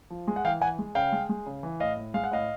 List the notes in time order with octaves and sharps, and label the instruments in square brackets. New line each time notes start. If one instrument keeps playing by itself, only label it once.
[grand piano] F3
G#3
F#5
E3 F5 G5
E3 F#5 G#5
G#3
C#3 F5 G5
G#3
G#3
C#3
E3
A2 D#5 F5
A2
G#3 F5
F#5
A2 D#5 F5